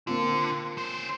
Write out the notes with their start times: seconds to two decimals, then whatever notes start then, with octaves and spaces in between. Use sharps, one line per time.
0.07 D3 A#3 C4 F4
0.78 C#4 C5